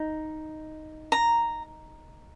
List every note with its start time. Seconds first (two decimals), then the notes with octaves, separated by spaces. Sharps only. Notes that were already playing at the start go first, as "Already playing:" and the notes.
Already playing: D#4
1.12 A#5